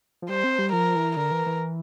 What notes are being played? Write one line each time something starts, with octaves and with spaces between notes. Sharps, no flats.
F3
G3 C5
C4
G3
F3 A#4
E3
D3 A#4
E3
E3